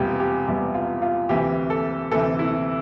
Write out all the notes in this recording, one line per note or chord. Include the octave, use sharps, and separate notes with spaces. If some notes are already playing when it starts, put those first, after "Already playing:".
Already playing: E1 E2 C3 G3 F4 G4
G4
E1 E2 C3 G3 G4
F4
F4
D2 C3 E3 G4
A4
D2 C3 E3 A4
E4